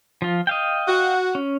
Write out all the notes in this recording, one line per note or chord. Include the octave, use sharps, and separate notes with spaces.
F3 F4
D#5 F5 G5
F#4
C#4